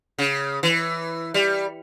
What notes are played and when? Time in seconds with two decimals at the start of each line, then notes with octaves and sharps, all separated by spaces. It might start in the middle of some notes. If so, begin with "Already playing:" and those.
0.18 C#3
0.63 E3
1.34 G3